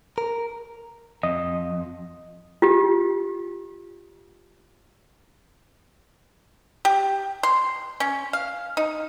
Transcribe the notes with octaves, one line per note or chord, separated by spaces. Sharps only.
A#4
F2 D#5
F4 G4
G4
C6
C#4
F5
D#4